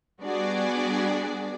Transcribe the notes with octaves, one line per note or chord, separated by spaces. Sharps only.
G3 B3 D4 F#4 G#4 D5